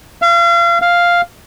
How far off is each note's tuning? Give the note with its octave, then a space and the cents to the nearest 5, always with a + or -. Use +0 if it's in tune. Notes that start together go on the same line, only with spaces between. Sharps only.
F5 -35
F5 +0